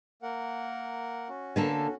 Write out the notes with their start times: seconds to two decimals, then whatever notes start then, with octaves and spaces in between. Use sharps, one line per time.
0.22 A#3 A#4 F#5
1.29 C#4 F#4
1.56 D3 A#3 A4